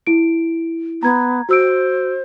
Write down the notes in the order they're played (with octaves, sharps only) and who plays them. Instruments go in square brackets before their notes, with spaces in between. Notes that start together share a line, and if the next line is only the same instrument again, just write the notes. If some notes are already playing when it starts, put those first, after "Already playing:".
[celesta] E4 D7
[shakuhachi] B3 [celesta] A#5 G#6
[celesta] F#4 E6 D7 [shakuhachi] C5